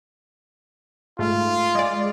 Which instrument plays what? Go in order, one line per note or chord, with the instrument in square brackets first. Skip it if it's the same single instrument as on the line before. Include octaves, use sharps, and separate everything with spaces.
[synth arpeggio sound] G#2 A3 [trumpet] F4
[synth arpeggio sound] G#3 D5